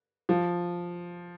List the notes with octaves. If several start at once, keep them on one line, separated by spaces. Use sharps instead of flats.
F3